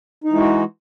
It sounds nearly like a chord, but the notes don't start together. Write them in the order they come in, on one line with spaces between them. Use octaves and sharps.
D#4 E3 G#3 F#4